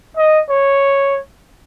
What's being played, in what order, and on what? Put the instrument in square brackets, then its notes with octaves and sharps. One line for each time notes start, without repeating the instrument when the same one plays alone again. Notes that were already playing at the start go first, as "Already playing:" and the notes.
[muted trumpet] D#5
C#5